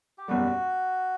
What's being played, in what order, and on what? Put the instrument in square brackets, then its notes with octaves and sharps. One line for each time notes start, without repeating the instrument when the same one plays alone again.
[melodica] G4
[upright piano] F#1 E2 B2 G3 [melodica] F#4